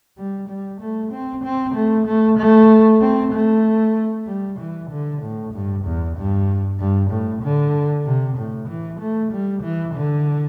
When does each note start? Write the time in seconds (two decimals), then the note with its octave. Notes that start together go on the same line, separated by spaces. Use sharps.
0.17 G3
0.49 G3
0.81 A3
1.12 C4
1.44 C4
1.75 A3
2.07 A3
2.38 A3
3.01 C4
3.32 A3
4.27 G3
4.59 E3
4.90 D3
5.22 A2
5.54 G2
5.85 E2
6.17 G2
6.79 G2
7.10 A2
7.42 D3
8.05 C3
8.37 A2
8.68 E3
9.00 A3
9.32 G3
9.63 E3
9.94 D3